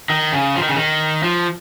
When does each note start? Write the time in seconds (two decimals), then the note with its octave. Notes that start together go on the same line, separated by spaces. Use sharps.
0.10 D#3
0.33 C#3
0.56 F3
0.62 D#3
0.69 C#3
0.76 D#3
1.23 F3